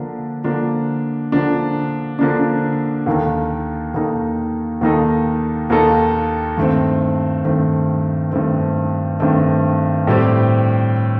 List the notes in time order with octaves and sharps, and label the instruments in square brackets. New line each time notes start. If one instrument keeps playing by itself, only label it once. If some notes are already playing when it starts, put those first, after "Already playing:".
Already playing: [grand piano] D3 F3 A#3 D4
D3 F3 A#3 D4
D3 F3 A#3 D4
D3 F3 A#3 D4
D#2 D#3 A#3 D#4 A4
D#2 D#3 A#3 D#4 A4
D#2 D#3 A#3 D#4 A4
D#2 D#3 A#3 D#4 A4
G2 D#3 A3 C4
G2 D#3 A3 C4
G2 D#3 A3 C4
G2 D#3 A3 C4
A2 G3 C4 G4